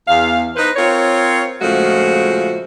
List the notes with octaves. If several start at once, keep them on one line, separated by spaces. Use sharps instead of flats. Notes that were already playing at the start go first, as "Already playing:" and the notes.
E2 F5
D#4 B4 C5
C4 F4 A#4 C#5
A#2 C#3 F3 G#3 A3 F#4